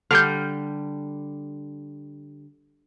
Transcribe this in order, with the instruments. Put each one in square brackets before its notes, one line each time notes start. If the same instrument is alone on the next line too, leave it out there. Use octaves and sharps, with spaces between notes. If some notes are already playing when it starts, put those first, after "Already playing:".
[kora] D3 G3 [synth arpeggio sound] F6 G6